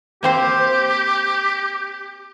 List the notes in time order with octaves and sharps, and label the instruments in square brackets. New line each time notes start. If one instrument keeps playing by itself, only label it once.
[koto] A#3 C4 C5 [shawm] G4